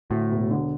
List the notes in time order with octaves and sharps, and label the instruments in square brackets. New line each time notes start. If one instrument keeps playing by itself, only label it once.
[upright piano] D2 [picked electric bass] A2
[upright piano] E1
D3